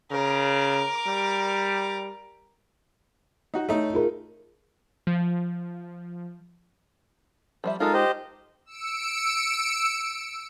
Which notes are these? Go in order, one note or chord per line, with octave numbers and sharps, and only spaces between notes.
C#3 A#4 D6
G3
D#4 F#4
A3 D#4 C#5
F4 G#4 A#4
F3
F3 G3 E5
G#3 D#4 F4 A4 A#4 F5
G4 C5 D#5
E6 C#7 D7